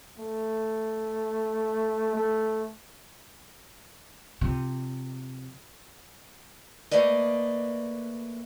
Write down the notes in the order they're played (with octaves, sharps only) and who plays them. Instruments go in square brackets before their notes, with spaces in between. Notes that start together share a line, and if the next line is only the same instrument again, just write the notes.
[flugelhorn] A3
A3
[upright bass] C3 F3
[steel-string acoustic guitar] A3 A#3 B4 D5 D#5